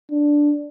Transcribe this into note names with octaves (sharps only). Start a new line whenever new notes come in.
D4